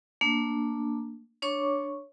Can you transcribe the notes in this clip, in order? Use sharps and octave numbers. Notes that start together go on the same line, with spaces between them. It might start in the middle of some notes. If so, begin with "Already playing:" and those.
A3 A#3 D4
D4 C#5 C#6 D6